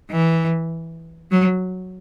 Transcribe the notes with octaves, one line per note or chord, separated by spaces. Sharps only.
E3
F#3